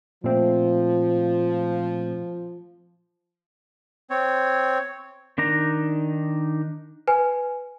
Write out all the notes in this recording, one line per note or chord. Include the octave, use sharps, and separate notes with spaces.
A#2 F3 A3 C4
C4 C#5
D#3 D4 D#4 A#5
B4 G#5